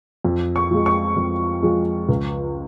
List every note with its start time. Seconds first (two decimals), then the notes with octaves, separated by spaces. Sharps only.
0.25 F2
0.56 C#6
0.71 F3 G#3
0.86 C#6
1.16 F2
1.62 F3 G#3
2.09 C#2